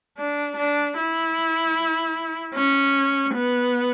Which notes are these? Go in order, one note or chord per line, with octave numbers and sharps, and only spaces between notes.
D4
D4
E4
C#4
B3